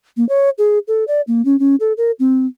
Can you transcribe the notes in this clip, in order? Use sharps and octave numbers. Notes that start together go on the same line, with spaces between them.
A#3
C#5
G#4
A4
D5
A#3
C#4
C#4
A4
A#4
C4